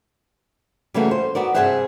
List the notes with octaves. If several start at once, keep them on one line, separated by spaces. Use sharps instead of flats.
C#3 E3 G3 A3 A#3 F#4
C5
B3 F#4 A#4 D5
G2 C3 G#4 C5 E5 F#5